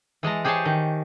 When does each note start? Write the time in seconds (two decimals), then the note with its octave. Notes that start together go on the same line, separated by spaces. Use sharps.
0.23 E3 G#3 A5 A#5
0.44 G4 G#4 C5 C#5 G#5 A5
0.65 D#3